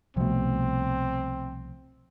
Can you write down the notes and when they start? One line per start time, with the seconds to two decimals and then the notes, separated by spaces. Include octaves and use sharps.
0.17 C2 B2 F3 A3 C4